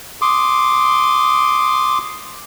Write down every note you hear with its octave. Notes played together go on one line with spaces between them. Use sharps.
C6 D6 D#6